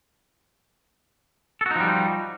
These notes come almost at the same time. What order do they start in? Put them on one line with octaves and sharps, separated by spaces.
A4 F#4 D#4 F3 G3